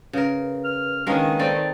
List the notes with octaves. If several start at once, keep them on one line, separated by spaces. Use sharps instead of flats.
C#3 A#4 B4
F6
D#3 G#3 A#3 C#4 D4 B4
C4 D#4 A4 D5